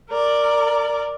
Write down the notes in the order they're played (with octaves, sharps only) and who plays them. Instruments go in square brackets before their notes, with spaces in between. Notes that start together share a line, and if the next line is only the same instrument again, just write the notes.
[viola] A#4 D5